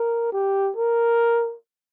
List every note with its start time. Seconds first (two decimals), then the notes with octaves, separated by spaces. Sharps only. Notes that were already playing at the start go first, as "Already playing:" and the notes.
Already playing: A#4
0.32 G4
0.77 A#4